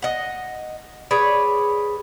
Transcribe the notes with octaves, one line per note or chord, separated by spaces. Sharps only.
D#5 F#5
G#4 B4 C#5 D5